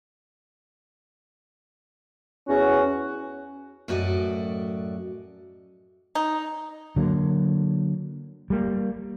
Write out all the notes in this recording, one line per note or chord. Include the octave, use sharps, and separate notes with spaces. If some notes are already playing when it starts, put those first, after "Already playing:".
E2 C#4 F#4
F#2 A2 F#4 D5 D#5
D#4
D3 F#3 A#3
G3 A#3